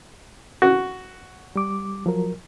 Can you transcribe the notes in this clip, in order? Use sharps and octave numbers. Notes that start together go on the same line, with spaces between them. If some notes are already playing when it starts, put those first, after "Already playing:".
F#4
G3 D6
F3 F#3 A#4